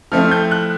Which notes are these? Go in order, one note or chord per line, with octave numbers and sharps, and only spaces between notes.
F3 A3 C4 E4 F6
G6
F#6